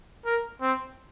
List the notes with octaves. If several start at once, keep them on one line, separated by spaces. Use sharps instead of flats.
A#4
C4